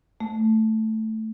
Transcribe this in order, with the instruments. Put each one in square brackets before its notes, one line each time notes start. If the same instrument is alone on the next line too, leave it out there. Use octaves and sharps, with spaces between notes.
[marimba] A3